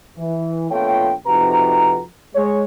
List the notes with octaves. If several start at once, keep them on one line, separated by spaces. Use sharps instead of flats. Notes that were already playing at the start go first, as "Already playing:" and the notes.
E3
A#1 A3 B3 F4 C#5 G5
F2 C3 D#4 F#4 B4 A#5
G#3 C#5